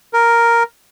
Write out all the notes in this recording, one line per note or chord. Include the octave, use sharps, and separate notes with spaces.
A#4